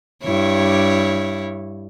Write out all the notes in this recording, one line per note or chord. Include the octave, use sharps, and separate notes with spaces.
G2 E4 C#5